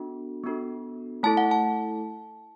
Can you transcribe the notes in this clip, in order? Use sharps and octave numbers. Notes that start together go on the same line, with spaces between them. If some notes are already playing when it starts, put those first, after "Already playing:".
Already playing: B3 D4 F#4 A4
B3 D4 F#4 A4
A3 E4 A4 A5
F#5
A5